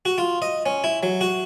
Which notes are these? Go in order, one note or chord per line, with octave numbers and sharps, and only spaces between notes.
F#4
F4
D#5
C#4
E4
F#3
F#4